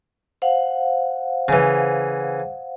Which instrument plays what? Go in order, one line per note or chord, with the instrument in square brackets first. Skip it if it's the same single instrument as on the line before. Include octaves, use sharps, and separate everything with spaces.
[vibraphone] C5 F5 F#5
[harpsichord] C#3 E3